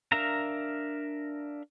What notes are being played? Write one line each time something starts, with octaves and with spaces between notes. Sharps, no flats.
D4 A#4 E5 F5 A#5